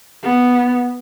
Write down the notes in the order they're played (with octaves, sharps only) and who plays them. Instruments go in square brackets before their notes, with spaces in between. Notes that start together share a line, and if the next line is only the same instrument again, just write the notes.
[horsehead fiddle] B3